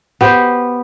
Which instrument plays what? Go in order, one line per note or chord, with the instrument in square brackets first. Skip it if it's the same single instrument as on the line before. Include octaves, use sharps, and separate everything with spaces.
[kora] B3 G4 C5